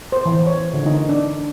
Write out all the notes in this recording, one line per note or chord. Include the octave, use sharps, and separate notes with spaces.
C5
E3
C#5
D3
D#4
D4